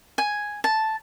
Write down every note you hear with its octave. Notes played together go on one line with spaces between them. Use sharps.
G#5
A5